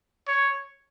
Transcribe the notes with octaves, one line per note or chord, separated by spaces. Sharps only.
C#5